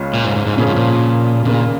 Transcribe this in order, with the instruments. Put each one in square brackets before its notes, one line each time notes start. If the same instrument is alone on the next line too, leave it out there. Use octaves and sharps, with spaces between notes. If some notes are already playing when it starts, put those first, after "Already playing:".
Already playing: [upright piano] C#2 C#3 G#3 C#4 F4
[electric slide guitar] A#2
G#2
G#2
G#2
[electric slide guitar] A#2 [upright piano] C#3 F3 C#4 G#4
[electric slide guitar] G#2
A#2
[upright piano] D#2 C#3 A#3 [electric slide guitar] A#2